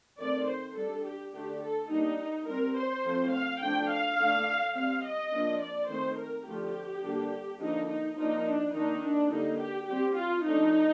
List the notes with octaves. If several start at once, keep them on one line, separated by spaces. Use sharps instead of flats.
D#3 A3 C4 D5
C5
G3 D4 A4
G4
D3 A3 D4 G4
A4
G3 A#3 D4 D#4
G3 C4 A#4
C5
F3 A3 C4
F5
F3 A3 D4 G5
F5
D3 A3 D4
G3 C4 F5
D#5
F3 A#3 D4
D5
D#3 A3 C4 C5
A#4
D3 F3 A3 G4
D3 G3 A#3 D4
D3 F3 A#3 D4 D#4
D#4
F3 A#3 D4 D#4
D4
D#3 A#3 D4 D#4
D4
D3 G3 A#3 D#4
G4
G3 C4 G4
F4
F3 A3 D4 D#4